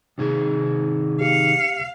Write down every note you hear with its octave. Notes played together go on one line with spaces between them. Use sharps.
C3 D#3 G#4
G4 F5 C#7